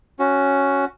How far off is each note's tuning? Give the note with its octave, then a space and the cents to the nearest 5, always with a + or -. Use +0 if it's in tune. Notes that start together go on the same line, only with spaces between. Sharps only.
C#4 +0 F#4 +0